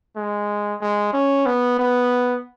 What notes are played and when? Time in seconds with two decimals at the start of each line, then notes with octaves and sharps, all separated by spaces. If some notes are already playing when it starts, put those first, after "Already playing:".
0.16 G#3
0.81 G#3
1.13 C#4
1.46 B3
1.79 B3